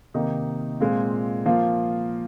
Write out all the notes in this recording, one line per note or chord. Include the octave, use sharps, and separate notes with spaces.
C3 D#3 A#3 D#4
A#2 G#3 C4 F4
F3 A#3 F4